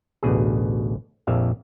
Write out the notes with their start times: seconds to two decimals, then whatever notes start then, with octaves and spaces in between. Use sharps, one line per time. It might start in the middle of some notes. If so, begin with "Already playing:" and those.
0.23 A1 D2 B2 G#4
1.27 A#1 F2 E5 F5